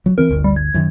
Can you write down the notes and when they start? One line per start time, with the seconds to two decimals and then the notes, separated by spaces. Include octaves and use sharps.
0.06 F#3
0.18 E3 C4 A#4
0.29 G1 D2
0.44 G3
0.56 G#6
0.74 F#2 D#3